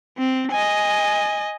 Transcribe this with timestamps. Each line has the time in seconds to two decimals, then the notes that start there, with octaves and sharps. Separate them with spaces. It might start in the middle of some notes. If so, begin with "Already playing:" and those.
0.18 C4
0.51 D#5 G#5